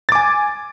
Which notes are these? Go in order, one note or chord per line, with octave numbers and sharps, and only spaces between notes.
G#5 D6 A6